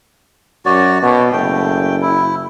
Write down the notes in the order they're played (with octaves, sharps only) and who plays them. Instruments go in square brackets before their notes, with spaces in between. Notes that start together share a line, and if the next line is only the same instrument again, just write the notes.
[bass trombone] F#2 [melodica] F#4 C#5 D5
[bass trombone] B2 [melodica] C#5
[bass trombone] F#1 [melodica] A3 G5
[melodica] E4